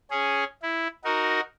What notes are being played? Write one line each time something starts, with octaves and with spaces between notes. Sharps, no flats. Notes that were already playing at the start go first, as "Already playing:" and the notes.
C#4 G#4
E4
D#4 F#4 A#4